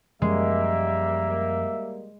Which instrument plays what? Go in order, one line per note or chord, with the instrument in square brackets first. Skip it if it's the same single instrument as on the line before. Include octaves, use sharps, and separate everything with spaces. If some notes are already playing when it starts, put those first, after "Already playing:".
[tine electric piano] F#2 F3 [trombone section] G3 A#3 [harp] G#3 [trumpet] E5